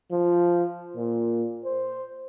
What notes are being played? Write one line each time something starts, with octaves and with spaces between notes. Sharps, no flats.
F3
A#2
C5